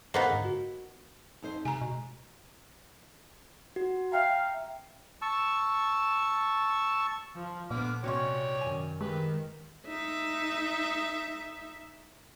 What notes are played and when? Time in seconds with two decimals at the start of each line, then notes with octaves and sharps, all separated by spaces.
0.14 A#3 B3 D#4 G#4 B4 C5
0.30 G#2 D3
0.45 F#4
1.42 F2 D#4 C5
1.65 C3 G#3 G#5 A#5
1.81 B2
3.76 F#4
4.12 E5 F5 G5 A#5
5.22 A5 C#6 E6
7.35 F3
7.71 A#2 D3 B3 D6 F6
8.04 C3 G#3 C#4 F#4 C#5 D5 G5
8.61 F#2 D#3 G#5
9.01 D#3 G#3 G4 B4
9.88 D#4 E5